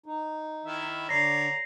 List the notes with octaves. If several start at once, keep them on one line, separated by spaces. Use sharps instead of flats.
D#4
D#3 E4 E5
D3 C#5 D5 A#5 A#6 C7